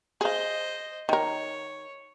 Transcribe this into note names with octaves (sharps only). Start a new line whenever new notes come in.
G#4 C5 D#5 F5
D#3 A#4 C#5